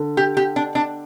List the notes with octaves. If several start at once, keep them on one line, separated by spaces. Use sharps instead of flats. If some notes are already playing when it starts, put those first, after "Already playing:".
Already playing: D3
G4
G4
D4
D4